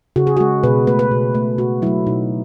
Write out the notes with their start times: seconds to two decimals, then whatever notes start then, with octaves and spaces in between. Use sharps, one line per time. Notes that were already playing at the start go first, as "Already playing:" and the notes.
0.16 C#3 F#4
0.27 G#4
0.37 G#3 F#4
0.63 B2 B4
0.87 A3 B4
0.99 B4
1.11 B2
1.35 A3
1.58 B2 F#4
1.82 F#3 A3 E4
2.07 B2 D#4